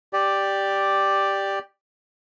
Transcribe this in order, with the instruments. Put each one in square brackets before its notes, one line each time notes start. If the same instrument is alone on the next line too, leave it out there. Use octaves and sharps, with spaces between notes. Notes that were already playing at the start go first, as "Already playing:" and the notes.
[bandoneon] G4 D5